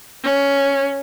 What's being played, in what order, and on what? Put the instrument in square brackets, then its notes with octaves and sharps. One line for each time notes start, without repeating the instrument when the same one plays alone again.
[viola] C#4